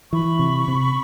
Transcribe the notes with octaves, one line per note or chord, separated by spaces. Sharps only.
E3 B5 C#6
C3
C3